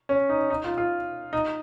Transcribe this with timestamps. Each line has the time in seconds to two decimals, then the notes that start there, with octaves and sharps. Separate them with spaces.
0.09 C#4
0.29 D#4
0.50 D#4
0.64 F4
0.78 F4
1.33 D#4